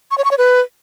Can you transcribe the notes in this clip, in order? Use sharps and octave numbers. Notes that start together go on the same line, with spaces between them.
C#6
C#5
C#6
C#5
B4